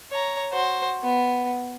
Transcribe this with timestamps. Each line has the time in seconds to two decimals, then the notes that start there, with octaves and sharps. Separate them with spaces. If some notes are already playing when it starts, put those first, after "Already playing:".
0.11 C#5 A#5
0.52 F#4 C5
1.03 B3